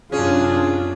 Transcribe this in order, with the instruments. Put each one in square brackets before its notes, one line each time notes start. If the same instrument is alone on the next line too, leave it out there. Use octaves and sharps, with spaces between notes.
[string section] F#2 C3 D4 [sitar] C#4 [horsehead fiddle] F4 [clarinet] G#4